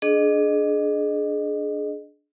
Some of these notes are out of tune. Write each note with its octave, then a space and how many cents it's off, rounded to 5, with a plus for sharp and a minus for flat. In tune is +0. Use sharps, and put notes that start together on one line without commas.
D4 +0 G#4 +25 D#5 -25